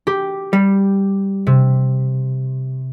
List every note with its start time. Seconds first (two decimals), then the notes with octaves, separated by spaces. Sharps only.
0.07 G4
0.53 G3
1.47 C3